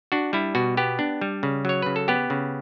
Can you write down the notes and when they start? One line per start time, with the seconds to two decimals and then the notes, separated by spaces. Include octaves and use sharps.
0.12 D4 F#4
0.33 G3 E4
0.55 B2 F#4
0.77 B3 G4
0.99 D4
1.21 G3
1.43 C#3
1.65 F#3 C#5
1.82 C#3 B4
1.96 A4
2.08 B3 G4
2.30 C#3